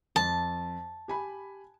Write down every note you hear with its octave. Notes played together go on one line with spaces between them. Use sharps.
F2 A5
G4 G#5 B5